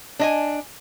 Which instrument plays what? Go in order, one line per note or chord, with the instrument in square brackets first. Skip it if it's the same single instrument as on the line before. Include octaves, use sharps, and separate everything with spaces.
[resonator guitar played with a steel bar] D4 D#5 G#5